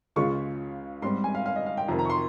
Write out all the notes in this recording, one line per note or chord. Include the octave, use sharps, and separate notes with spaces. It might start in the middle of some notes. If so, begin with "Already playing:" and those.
C#2 C#3 G#3 C#4 F4 C#6
G#2 G3 C4 C6
G#5
F5
F5
D#5
F5
G5
F2 C3 D#3 A#5
A#5
C#6
C6